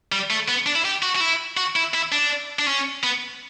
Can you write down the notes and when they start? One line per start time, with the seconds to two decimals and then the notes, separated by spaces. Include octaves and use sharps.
0.12 G3
0.30 A3
0.48 B3
0.66 D4
0.75 E4
0.85 G4
1.03 F#4
1.16 F#4
1.20 E4
1.57 F#4
1.76 E4
1.94 E4
2.12 D4
2.59 D4
2.67 C#4
3.04 B3